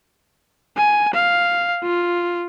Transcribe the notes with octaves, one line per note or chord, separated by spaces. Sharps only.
G#5
F5
F4